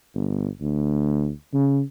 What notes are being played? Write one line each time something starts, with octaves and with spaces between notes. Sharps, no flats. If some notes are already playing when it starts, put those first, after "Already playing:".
G1
D2
C#3